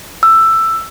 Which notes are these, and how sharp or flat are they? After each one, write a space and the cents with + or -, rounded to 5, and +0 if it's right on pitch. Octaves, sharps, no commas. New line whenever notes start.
E6 +10